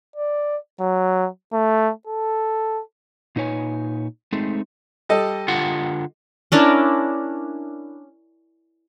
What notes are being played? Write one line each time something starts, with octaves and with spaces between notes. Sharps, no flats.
D5
F#3
A3
A4
A#2 D#4 B4 C#5 G#5
G#3 A3 C4 D#4 G#4 A4
G3 A4 D#5
D3 F4 F#5
C#4 D4 E4 A#4